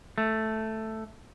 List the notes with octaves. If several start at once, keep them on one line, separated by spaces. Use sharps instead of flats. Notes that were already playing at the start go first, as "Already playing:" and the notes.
A3